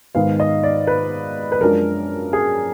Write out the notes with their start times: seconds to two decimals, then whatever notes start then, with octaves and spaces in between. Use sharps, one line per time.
0.15 G#2 D#3 G#3 B3 D#4 F5
0.40 D#5
0.63 D5
0.87 B4
1.52 B4
1.61 F#2 F3 G#3 D4 A#4
2.33 G#4